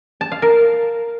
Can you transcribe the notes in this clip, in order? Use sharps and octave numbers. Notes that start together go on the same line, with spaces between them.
A5
F5
A#4